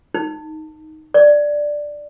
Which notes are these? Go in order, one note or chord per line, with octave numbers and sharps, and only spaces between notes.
D#4
D5